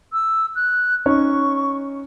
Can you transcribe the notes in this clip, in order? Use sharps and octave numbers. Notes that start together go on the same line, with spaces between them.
E6
F#6
C#4 D#4 C#5 C#6